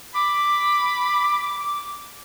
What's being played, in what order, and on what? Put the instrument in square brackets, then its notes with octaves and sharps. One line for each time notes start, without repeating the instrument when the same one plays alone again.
[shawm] B5 [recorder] D6